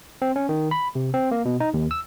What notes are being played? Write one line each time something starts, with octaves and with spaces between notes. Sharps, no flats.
C4
C#4
D#3
B5
C3
C4
A#3
B2
D#4
D#2
E6